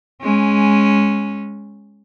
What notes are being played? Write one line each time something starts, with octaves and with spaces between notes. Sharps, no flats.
G#3 C#4